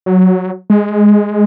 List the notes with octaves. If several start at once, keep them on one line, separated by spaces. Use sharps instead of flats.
F#3
G#3